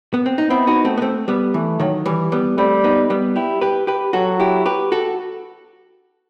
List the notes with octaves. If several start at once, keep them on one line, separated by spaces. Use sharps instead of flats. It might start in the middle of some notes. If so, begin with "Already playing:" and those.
B3
C4
D#4
B3 C4 E4
D#4 F#4
A3 C4
B3
A3 C4
G3 B3
E3 A3
D#3 F#3
E3 G3
G3 B3
G3 A3 C4
B3 D#4
G3 B3
E4 G4
G4 B4
G4 B4
F#3 F#4 A4
E4 G4
G4 B4
F#4 A4